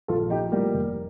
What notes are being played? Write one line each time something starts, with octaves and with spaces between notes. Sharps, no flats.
A#1 F4 A4
F3 D#4 G4
A2 G3 A#3
F1